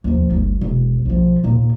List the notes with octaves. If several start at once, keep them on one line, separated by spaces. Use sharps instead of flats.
D#2 F3
G1 D2
E1
B1 F3
D#2 A#2